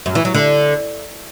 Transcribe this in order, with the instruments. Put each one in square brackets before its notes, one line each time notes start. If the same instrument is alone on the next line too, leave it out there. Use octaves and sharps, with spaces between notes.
[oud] F#2
E3
F#3
D3